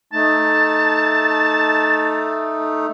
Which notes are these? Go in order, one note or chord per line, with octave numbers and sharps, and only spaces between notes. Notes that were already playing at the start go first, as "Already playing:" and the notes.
A3 D#4 A5